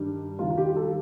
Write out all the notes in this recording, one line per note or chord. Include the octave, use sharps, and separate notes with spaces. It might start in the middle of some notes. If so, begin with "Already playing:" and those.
Already playing: G2 D#3 G3 G4
D#2 D#3 G3 F4
F4
G4
A4